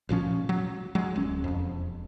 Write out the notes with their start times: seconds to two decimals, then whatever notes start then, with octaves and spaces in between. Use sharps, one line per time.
0.09 A1 A#2 F3 C#4
0.49 F#3
0.95 F#3 G#3
1.16 D1 C#4
1.44 E1 F2